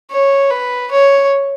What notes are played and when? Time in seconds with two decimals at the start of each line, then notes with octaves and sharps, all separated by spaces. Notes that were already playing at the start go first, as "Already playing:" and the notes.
0.11 C#5
0.51 B4
0.91 C#5